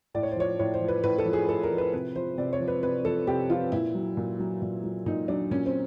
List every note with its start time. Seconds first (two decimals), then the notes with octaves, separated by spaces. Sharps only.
0.15 A2 D5
0.23 C#5
0.32 C5
0.36 F3 C#5
0.59 A2 C#5
0.74 C5
0.81 F3
0.88 B4
1.03 A2 B4
1.18 A4
1.25 F3
1.33 G#4
1.49 A2 A4
1.63 A#4
1.71 F3
1.78 B4
1.93 C3 B4
2.15 F3 C5
2.38 C3 D5
2.53 C#5
2.60 F3
2.68 B4
2.83 C3 B4
3.05 F3 A4
3.27 C3 G4
3.50 F3 F4
3.72 A#2 E4
3.95 F#3
4.17 A#2
4.39 F#3
4.62 A#2
4.84 F#3
5.06 A#2 D#4
5.28 F#3 D4
5.51 A#2 C#4
5.66 C4